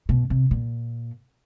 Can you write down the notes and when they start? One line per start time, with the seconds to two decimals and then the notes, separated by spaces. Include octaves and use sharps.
0.09 B2
0.30 C3
0.51 A#2